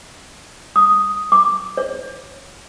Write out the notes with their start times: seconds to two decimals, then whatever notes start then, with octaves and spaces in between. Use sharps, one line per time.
0.76 D#6
1.32 D6
1.77 C#5